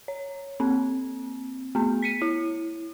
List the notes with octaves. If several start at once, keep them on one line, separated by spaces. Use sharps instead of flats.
C#5
A#3 C4
A3 B3
B6 C#7 D#7
E4